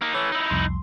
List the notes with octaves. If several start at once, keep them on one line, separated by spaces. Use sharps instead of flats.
A#3 D#4
E3 A3 C#5
D#4 E4
C2 F2 C6